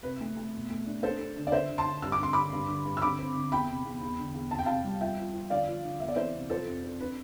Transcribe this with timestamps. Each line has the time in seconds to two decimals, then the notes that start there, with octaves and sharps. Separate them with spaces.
0.03 C3 B4
0.21 A3
0.36 A3
0.53 B2
0.70 A3
0.86 D4
1.03 D4 A4 C5
1.19 D4
1.36 D3
1.47 D5
1.52 D3 C5 E5
1.69 D3
1.78 A5 C6
1.86 D3
2.02 G2 E6
2.12 D6
2.19 D3 C6
2.33 D3 B5 D6
2.53 G2
2.68 D3
2.85 G2
2.97 E6
3.01 D3 B5 D6
3.19 C4
3.35 D3
3.52 E2 G5 B5
3.68 C3
3.85 E2
4.01 E2
4.18 D3
4.34 E2
4.51 F2 A5
4.59 G5
4.66 C3 F5 A5
4.84 G3
5.01 F3 E5 G5
5.17 F3
5.34 F3
5.50 D3 D5 F5
5.68 F3
5.84 D3
6.00 B3 E5
6.08 D5
6.16 E3 C5 E5
6.34 C3
6.50 F3 A4 C5
6.67 F2
6.84 C4
7.00 D4 B4